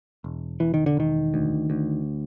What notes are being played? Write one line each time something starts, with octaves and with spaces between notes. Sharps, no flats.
E1
E1 E3
D#3
D3
E1 D#3
D2
D2